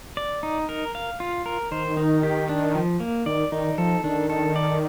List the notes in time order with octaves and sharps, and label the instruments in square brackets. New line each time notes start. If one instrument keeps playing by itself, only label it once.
[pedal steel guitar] D5
D#4
A#4
F5
F4
A#4
[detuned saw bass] D#3 [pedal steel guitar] C5
[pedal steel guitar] D#4
G4
D4
F3
A#3
[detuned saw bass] D#3 [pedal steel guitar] D5
[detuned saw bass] D#3 [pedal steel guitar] D#4
[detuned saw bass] F3 [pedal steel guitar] A4
[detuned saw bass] D#3 [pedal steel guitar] D4
[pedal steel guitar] A4
D5